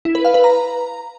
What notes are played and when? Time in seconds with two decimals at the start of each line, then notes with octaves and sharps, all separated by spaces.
0.05 E4
0.15 B4
0.25 F5
0.34 B4
0.44 A#5